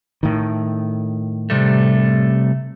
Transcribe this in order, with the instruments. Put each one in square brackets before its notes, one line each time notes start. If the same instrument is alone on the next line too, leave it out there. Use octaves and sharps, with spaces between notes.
[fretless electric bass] A2 D#3
[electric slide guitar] C3 G3 A3